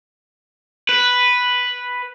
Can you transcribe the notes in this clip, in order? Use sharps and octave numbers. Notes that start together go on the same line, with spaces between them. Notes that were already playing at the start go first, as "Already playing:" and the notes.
B4